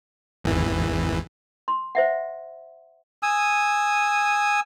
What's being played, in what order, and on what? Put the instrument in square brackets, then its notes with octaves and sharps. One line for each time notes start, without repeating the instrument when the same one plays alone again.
[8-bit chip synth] G#1 E2 E3
[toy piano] C6
C5 E5 F#5
[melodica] G#5 D#6 E6